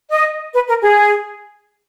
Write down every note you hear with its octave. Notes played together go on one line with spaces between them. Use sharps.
D#5
B4
A#4
G#4